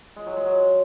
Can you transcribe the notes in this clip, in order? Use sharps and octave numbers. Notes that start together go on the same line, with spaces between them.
G#3
F#3
G#3
F#3